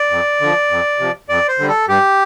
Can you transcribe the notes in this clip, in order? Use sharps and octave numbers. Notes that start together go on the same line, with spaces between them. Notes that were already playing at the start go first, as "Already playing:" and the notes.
Already playing: D5
F2
D3 F3
F2
C3 F3
F2 D5
C5
D3 G3
A4
G2 G4